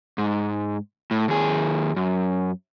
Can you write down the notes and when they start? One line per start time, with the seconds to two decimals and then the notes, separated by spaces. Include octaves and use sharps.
0.18 G#2
1.11 A2
1.28 D#2 G#4
1.96 F#2